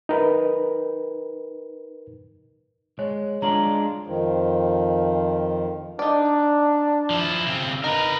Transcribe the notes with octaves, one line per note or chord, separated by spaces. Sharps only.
D#4 A#4 B4
G#3 C#5
G#3 D4 F4 A#5 F#7
F2 D#3 F3
D4 D#4 D5
F3 E4
C#3 C4
D#4 A#4 B4